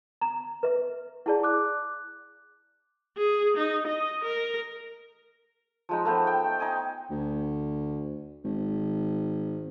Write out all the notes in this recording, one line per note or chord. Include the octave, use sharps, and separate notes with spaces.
A#5
B4 E5
E4 G#4 D5 F#5 A5
D6 F#6
G#4
D#4
D#5
A#4
F3 G#3 D#4
A3 B3 C5
G5
D#4 G#5
D2
G#1